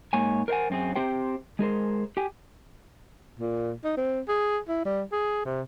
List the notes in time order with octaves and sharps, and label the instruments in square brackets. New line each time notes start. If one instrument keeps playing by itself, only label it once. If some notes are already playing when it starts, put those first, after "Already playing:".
[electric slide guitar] G#2 A#3 C#5 G#5
A#4 C5 D5 F#5 G#5
F#2 C4 G#4
C4 G4 C5 G5
G#3 G#4 A#4 C5
G4 G5 G#5
[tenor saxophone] A#2
D#4
C4
G#4
E4
G3
G#4
C3